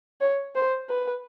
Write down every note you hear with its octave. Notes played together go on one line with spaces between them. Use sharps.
C#5
C5
B4